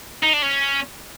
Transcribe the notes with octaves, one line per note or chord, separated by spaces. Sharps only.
D#4
D4
C#4